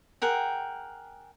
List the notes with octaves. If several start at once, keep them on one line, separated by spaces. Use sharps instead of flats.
G#4 A#4 F#5 G5